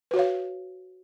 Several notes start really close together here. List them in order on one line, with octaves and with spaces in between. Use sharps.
B4 F#4 C#5 F5